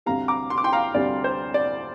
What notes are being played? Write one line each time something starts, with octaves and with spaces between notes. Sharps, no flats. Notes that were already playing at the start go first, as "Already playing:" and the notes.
D2 C3 G3 F5 A#5
A#5 D6
C6
D6
G5 C6
F5 A#5
D2 C3 G3 D5
C5
D5